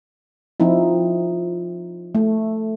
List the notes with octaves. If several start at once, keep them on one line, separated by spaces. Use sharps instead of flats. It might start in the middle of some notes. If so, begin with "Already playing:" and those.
F3 C4 D#4 E4
A3